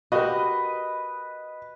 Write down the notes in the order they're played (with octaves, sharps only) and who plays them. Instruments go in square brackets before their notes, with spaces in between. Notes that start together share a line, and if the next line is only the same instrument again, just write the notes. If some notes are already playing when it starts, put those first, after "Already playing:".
[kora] F#4 G4 A#4 [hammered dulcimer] B4 [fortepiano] D#5